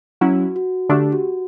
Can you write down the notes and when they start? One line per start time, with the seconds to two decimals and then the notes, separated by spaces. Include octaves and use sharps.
0.21 F#3 C#4 E4 F#4
0.56 F#4
0.89 D3 A3 D4 G4
1.12 F#4